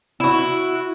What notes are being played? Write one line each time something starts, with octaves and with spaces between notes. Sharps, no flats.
E4 F#4